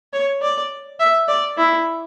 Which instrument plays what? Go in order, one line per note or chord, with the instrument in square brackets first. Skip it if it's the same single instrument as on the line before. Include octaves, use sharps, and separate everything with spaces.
[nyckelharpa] C#5
D5
E5
D5
E4